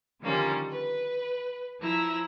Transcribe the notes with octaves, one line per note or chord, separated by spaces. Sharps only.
D3 D#3 F3 G3 A#3 C#4
B4
F3 E4 A#5 E6